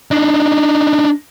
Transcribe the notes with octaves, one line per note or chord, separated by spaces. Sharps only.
D4 D#4